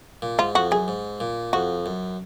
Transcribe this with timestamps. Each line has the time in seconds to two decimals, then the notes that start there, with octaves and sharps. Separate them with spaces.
0.22 A#2
0.39 G#2 F4
0.55 F2 F#4
0.71 F#2 G#4
0.88 G#2
1.20 A#2
1.53 F2 F#4
1.86 F#2